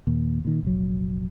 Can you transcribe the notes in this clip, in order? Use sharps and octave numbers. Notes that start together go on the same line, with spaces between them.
D#2 A#2
A#2 D#3
F1 A#1 F#3